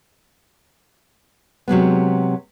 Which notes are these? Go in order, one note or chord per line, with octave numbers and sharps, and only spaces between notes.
C3 F#3 G#3 B3